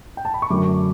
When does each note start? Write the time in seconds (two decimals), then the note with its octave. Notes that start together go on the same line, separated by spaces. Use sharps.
0.17 G5
0.25 A5
0.34 B5
0.42 C#6
0.50 F#2 D3 F#3 A3 D6